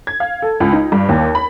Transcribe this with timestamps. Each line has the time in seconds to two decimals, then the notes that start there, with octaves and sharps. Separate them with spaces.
0.07 G#6
0.20 F5
0.42 A4
0.60 C#2
0.73 D#4
0.92 G2
1.09 D#2
1.35 B5